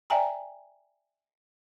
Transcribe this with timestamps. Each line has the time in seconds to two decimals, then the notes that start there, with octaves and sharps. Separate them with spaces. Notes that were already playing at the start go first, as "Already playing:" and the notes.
0.10 D5 E5 G5 G#5 A#5